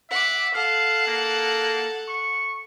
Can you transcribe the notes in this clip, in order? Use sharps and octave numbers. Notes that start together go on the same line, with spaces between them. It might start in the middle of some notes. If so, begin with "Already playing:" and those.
E5 F#5 D6
A4 F5 F#5
A#3
C#6